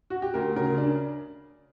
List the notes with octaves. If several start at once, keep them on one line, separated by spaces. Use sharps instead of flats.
F#4
G4
D2 A#4
C#3 A#4
D4